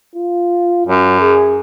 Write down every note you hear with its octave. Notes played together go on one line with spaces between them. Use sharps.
F4
F#2 F#3
G#4